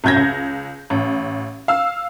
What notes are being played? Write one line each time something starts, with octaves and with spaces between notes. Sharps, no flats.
C2 F#2 G6 G#6 A#6
C#2
A1
F5 E6